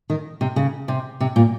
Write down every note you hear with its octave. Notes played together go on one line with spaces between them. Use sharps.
D#3
C3
C#3
C3
C3
A#2